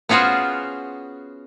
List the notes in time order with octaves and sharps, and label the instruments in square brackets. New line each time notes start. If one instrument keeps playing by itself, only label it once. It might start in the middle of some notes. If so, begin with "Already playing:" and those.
[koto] B3 C#4 F4 F#4 G#4 C5